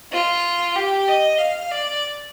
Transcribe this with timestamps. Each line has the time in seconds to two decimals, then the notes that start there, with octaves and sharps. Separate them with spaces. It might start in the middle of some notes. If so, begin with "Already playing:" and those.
0.12 F4
0.75 G4
1.08 D#5
1.38 F5
1.71 D5